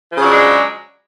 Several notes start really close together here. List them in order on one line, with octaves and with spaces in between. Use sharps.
F3 C#3 F#3 D4 G#3